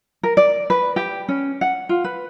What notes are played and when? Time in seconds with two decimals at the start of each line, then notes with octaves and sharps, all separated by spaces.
0.23 A#4
0.37 D5
0.70 B4
0.96 G4
1.29 C#4
1.61 F#5
1.89 F4
2.04 B4